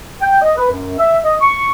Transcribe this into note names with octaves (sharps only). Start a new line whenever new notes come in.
G5
D#5
B4
F#2
E5
D#5
C#6